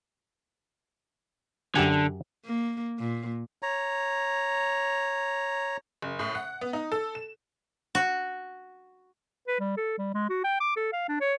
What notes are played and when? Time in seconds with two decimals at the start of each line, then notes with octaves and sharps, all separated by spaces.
1.75 F#2 D3 G4 G#5
2.46 A#3
2.99 A#2
3.63 C#5 A#5
6.02 F#1
6.19 A2
6.35 F#5
6.61 B3
6.73 D#4
6.92 A4
7.15 E7
7.95 F#4
9.48 B4
9.60 G3
9.77 A4
9.98 G3
10.14 G#3
10.29 F#4
10.44 G5
10.60 D6
10.76 A4
10.93 F5
11.08 D4
11.21 C#5